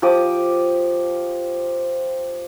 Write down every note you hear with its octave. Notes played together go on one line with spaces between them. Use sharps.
F3 G4 D6 D#6